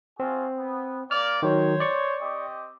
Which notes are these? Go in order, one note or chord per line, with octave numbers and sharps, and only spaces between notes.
C4 F4 F#4 G#4
B3
A#3 D5 F6
D#3 F#3 C5 C#5
D5 C#6
C4 G4 D#5